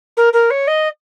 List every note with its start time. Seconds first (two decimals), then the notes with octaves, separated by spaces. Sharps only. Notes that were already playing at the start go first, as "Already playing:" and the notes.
0.17 A#4
0.33 A#4
0.50 C#5
0.67 D#5